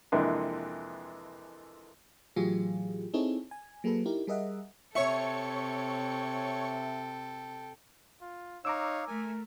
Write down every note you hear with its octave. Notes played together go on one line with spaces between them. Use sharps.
F2 C3 E3 G#3 A#3 D4
A2 E3 F#3 F4 G4 G#4
C4 D#4 E4 G#4 A4 C#5
G#5
F#3 A#3 G#4 A4 B4
D#4 E4 G4 A#4
G3 G#4 A#4 D#5 E5 F#5
C3 A4 C#5 E5 G5 C#6 C#7
F4
D#4 C#5 F5 A#5 D6 E6
A3 A#4 G#5